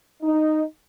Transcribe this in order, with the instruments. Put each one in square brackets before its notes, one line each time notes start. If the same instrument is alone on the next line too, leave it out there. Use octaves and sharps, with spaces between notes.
[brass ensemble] D#4